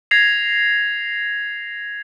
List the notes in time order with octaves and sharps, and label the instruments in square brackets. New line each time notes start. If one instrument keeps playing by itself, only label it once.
[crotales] G#6 A#6 C7 F7